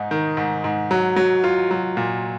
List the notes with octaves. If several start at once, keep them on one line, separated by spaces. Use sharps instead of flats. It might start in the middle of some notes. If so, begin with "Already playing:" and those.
Already playing: G#2 D#4
D#3
G#2
G#2
F#3
F#3
F4
F#3
A#2